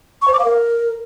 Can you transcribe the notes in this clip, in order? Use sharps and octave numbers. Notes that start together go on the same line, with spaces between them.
C#6
C5
D6
F5
A#4